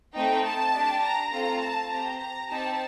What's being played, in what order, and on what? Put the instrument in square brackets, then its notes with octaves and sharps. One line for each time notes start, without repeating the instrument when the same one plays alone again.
[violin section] A3 C4 D#4 G5
A5
D4 G4
A#5
A3 C4 F4 A4 A#5
A5
C4 G4 A#5
A#5
C4 D#4 G4 A5